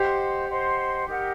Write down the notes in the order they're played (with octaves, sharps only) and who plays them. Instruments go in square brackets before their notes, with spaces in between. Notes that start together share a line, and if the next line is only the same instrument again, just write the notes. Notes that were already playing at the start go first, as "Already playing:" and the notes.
Already playing: [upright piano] G4 [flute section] C5 D#5 F#5 C6
[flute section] C5 D#5 F#5 C6
D#4 G4 A#4 F#5